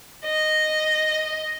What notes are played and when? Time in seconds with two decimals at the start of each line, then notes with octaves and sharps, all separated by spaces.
0.25 D#5